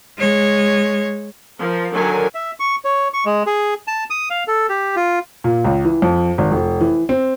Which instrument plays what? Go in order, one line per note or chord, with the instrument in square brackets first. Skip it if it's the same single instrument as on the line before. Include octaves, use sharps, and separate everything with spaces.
[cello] G#3 C#5
[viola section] F3 A#4
D3 D#3 F#3 A#4 G#5
[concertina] E5
C#6
C#5
C#6
G#3
G#4
A5
D#6
F5
A4
G4
F4
[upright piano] A#2
C#2
E3
F2
G#1
F1
E3
C4